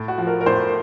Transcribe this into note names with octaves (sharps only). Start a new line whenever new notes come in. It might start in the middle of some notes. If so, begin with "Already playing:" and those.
Already playing: A2
F#4
F3
A#4
A#4
A2 C5